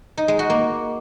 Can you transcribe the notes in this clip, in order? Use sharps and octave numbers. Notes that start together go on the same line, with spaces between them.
D#4
G#3
F#4
A#3